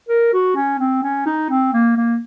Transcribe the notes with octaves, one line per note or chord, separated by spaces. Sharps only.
A#4
F#4
C#4
C4
C#4
D#4
C4
A#3
A#3